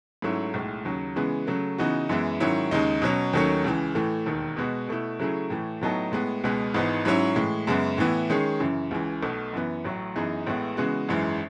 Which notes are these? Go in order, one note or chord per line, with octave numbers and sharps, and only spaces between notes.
G#2 F#3 A3 C#4 E4
B1 A2 G#3
D#2 C#3 F#3
C#3 E3 G#3 B3
C#3 F#3 A3
C#3 E3 B3 D#4 F#4
F#2 E3 G#3 B3 E4
G#2 D#3 F#3 C#4 E4
D#2 C#3 G#3 D#4
B2 F#3 C#4
D#2 D#3 F#3 A3 C#4
C#2 C#3 E3
A2 E3 A3
E1 D#2 D#3
B2 G#3 B3 F#4
B2 A3 E4
C#3 F#3 A3 E4 G#4
A2 E3 A3
A2 F#3 B3 D#4 A4
A2 G#3 B3
C#2 B2 G#3 B3
G#1 G#2 E3 B3 D#4
G#2 F#3 C#4 E4
A2 E3 G#3
F#2 C#3 G#3 B3
A2 E3 B3 E4
D#3 G#3 C#4 G#4
F#2 C#3 E3
C#2 C#3 E3
B1 B2 A3
F#2 E3 B3
A1 A2 F#3
F#2 E3 B3 D#4 G#4
A1 A2 G#3 B3
C#3 E3 G#3 B3 F#4
G#1 F#2 E3 G#3